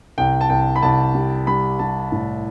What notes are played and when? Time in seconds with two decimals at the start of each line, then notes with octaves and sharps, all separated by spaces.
0.18 C2 G5
0.41 A5
0.50 C2 G5
0.76 B5
0.82 C2 A5
1.15 G3
1.47 G3 B5
1.79 G3 A5
2.12 A2